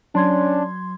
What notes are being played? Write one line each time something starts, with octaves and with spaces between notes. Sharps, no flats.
F#3 C#4 D4 C6 G#6